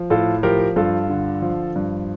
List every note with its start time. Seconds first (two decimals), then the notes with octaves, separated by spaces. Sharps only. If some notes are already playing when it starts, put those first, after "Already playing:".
Already playing: F3
0.10 A2 F4 A4
0.43 F3 G4 A#4
0.76 G2 F4 A4
1.10 D3
1.42 F3
1.76 G2